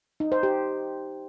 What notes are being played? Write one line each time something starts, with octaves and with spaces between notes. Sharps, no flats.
D#4
C5
G4